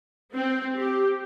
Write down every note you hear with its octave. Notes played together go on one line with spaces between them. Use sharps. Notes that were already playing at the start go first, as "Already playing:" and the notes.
C4
G4